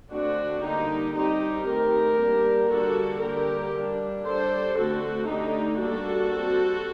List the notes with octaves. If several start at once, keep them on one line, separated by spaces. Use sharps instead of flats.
D3 A3 C4 D4 F#4
D3 G3 A#3 D#4 G4
G3 C4 D#4 G4
D#3 A3 C4 G4 A#4
G3 A#3 D4
D3 G3 A#3 D4 F#4 A4
D3 G3 A#3 G4 A#4
G3 A#3 D4
G3 D4 A4 C5
D3 A3 C4 F#4 A4
D3 A3 D4 D#4 G4
G3 A#3 D4 F#4 A4
G3 C4